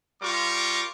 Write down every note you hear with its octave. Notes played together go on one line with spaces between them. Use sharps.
G3 F4 A#4 C#6 D6